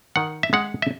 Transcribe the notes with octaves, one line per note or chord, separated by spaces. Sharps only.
D#3 F#5
E5
G#3 F#5
E5